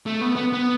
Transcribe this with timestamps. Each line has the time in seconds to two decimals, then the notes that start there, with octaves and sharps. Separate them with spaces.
0.06 A3
0.21 B3
0.36 B3
0.53 B3